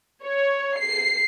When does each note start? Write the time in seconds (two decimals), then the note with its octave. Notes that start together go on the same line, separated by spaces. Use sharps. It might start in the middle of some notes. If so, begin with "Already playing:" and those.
0.24 C#5
0.78 C7